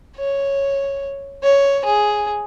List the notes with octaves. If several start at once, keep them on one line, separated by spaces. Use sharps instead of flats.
C#5
C#5
G#4